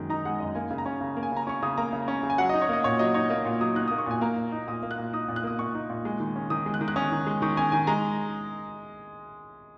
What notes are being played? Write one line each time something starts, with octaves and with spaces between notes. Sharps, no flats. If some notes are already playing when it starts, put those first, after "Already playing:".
Already playing: F#2 D#3 G#3
D#4 A#5
G#3 F#5
F#2 D#5
A#3 G#5
C#3
A#5
C#4
C#3
A#3
G#5
C#3 A#5
C#4 C#6
C#3 D#6
A#3 A#5
C#3
C#4
C#3
G#5
F#3 F#5
D#5
D#4
C#5
A#3 D#5
A#2 C#5
F#3 D#5
D#4 C#5
A#3 D#5
A#2
F#3 D#6
D#4 F#6
D#6
A#3
C#6
A#2 G#5
A#3 A#5
A#2
D#4
A#2 D#6
A#3
F#6
A#2
D#4 D#6
A#2
F#6
A#3 D#6
A#2 C#6
D#4
A#2
G#3
D#3
C#4
D#3 D#6
G#3
F#6
D#3
F#6
C#4 D#6
D#3
G#3
D#3 C#6
C#4 G#5
D#3 G#5
G#3 A#5